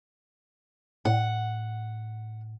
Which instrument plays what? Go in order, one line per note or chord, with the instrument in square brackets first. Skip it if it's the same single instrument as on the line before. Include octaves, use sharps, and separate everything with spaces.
[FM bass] A2 [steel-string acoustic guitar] F#5